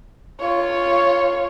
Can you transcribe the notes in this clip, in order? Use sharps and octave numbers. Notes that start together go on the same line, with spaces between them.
F4 C#5